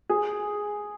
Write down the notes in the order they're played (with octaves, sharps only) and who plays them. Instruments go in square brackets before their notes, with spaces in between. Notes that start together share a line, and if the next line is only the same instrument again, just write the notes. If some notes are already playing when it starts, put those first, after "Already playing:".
[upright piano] G#4